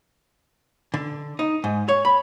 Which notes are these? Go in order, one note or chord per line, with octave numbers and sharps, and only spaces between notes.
D3
D#4
G#2
C#5
B5